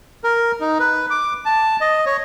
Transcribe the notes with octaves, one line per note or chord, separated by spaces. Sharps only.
A#4
D#4
B4
D6
A5
D#5
C#5